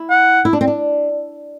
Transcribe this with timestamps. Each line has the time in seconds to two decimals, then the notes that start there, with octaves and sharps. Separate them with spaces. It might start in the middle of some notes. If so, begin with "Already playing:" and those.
Already playing: E4
0.10 F#5
0.45 E4
0.53 D4
0.61 C4
0.68 D4